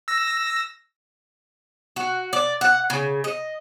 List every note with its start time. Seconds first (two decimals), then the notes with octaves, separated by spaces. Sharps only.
0.08 E6 A#6
1.96 F#4
2.33 D5
2.61 F#5
2.90 C#3
3.24 D#5